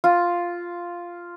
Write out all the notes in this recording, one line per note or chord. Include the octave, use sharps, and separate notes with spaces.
F4